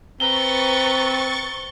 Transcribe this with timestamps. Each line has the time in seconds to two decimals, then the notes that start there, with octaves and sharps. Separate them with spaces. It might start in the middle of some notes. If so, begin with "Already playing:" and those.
0.20 C4 B4 A#5 C#6 A6 G7